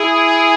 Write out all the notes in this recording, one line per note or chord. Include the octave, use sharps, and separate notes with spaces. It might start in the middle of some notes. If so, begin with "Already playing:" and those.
Already playing: E4 G#4